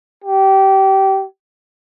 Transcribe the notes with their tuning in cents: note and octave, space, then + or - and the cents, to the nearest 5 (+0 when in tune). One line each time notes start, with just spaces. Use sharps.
G4 -20